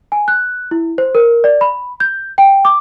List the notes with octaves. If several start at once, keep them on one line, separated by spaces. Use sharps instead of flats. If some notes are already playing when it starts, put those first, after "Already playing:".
G#5
F#6
E4
C5
A#4
D5
B5
G6
G5
D6